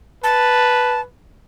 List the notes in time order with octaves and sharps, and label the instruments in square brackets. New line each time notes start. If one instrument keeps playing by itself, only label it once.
[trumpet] B4 [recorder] A5